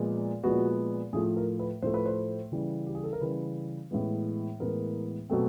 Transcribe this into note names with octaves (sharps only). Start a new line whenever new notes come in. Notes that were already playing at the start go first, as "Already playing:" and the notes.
Already playing: A#2 F3 G#3 B3
A#2 F3 G#3 B3 F#4
A2 F3 A3 G#4
A#4
B4
A2 F3 A3 C5
B4
C5
C#3 E3 G3
G4
G#4
A4
A#4
C#3 E3 G3 B4
A2 E3 G#3 B3
A2 E3 G#3 B3 A#4
B2 F#3 A3 C4